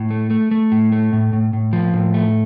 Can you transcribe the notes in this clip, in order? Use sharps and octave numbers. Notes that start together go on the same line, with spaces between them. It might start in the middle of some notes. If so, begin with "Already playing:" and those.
Already playing: A2
A3
A3
A3
A2
A3
A2
A2
A2
F3
A2
A3